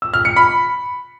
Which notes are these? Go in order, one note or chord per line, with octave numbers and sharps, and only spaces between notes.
E6
F6
C#7
B5